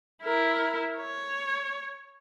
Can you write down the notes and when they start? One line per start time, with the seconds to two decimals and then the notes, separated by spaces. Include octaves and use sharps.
0.22 E4 A#4
0.98 C#5